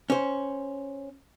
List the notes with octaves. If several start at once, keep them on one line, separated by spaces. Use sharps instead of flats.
C#4 C5